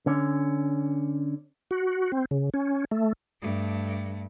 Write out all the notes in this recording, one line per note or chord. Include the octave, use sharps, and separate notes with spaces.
D3 C#4
F#4
C4
C#3
C#4
A3
G2 A3